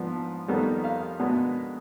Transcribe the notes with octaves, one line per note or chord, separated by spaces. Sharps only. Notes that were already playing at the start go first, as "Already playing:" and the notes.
Already playing: G#2 F3 B3 D4
F2 D#3 G3 B3
F5
B2 G#3 B3 D4